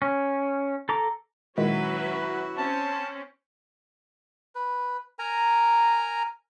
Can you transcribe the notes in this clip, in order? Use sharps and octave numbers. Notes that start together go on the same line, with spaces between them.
C#4
A4 A#5 D6
A#2 D#3 F#3 G#3 C#4 E4 F#4 B4
C4 C#4 A5
B4
A#4 G#5 A#5